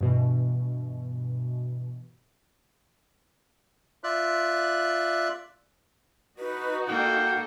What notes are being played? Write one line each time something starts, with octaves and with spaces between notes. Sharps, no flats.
G2 B2 E3
F4 D5 E5 F#6
D#4 F#4 B4
A#3 A4 F#5 G5